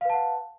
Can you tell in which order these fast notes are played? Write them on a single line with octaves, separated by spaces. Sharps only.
F5 B4 A5 F#5